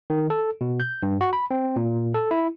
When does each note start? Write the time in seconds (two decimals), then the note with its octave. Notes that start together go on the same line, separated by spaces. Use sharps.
0.10 D#3
0.30 A4
0.61 B2
0.80 G6
1.03 G2
1.21 F#4
1.33 B5
1.51 C4
1.76 A#2
2.14 A4
2.31 E4